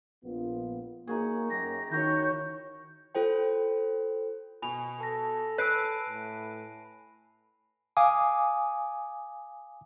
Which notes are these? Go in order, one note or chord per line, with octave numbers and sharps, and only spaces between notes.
A#1 B3 F4
A#3 D#4 F#4 G#4
F#2 G4 A#6
D#3 E4 F#4 C#5 G6
F4 A4 C5 G5
B2 G#5 B5 F7
A4 A5 A#6
B4 B5 E6 F#6 C7 D7
A2
F5 G#5 D6 D#6